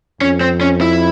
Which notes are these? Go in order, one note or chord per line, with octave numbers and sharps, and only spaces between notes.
F2 C#4
C4
C#4
E4